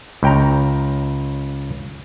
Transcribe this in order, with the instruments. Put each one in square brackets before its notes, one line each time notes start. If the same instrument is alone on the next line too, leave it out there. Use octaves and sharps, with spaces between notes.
[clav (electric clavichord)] C#2 G5 A#5